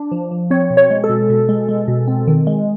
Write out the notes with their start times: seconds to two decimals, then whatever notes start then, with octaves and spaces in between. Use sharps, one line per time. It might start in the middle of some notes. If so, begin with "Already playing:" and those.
Already playing: D4
0.12 F3
0.31 F3
0.51 C4 C#5
0.70 B2
0.77 C#5
0.90 G#3
1.04 A4
1.09 B2
1.30 B2
1.49 G#3
1.69 G#3
1.88 B2
2.08 C4
2.28 D#3
2.47 G#3